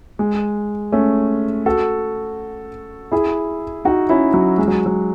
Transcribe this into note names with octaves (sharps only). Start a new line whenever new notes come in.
G#3
A3 C#4
F#4 A4
E4 G#4
D#4 F#4
C#4 E4
F#3
G#3
F#3
F#3